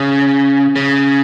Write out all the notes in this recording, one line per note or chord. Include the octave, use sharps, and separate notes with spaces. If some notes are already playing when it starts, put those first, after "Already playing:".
Already playing: C#3
C#3